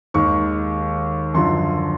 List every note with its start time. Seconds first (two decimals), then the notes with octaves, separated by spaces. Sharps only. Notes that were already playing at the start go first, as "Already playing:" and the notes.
0.14 D#2 D#3 G#3 C#6
1.34 F#2 D3 F3 C6